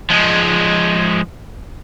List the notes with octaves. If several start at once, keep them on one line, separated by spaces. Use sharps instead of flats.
F3 G#3